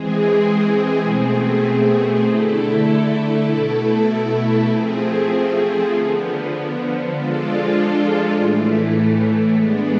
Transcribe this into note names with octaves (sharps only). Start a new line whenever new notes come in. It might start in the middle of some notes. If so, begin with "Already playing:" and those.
Already playing: E3 G#3 C4 G#4
B2 A3 C4 G#4
D3 A3 E4 A4
B2 A3 E4 A4
F3 A3 C4 G#4
D3 F3 B3
F3 G#3 D4 F4 A4
A2 E3 A3
G#3 B3 D4